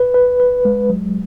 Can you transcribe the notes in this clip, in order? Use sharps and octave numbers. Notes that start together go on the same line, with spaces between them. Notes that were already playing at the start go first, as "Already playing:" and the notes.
Already playing: B4
B4
B4
G#3
F#3